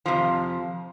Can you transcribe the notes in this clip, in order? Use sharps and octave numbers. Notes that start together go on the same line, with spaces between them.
F2 C3 F3